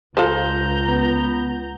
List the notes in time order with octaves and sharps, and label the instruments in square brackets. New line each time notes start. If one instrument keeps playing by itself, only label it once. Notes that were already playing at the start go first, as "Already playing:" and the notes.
[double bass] C#2 [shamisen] F4 A4 C5 [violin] A#5 G6
[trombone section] B3